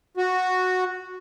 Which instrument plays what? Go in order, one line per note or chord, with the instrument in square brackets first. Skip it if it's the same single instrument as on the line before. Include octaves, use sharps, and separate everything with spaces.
[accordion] F#4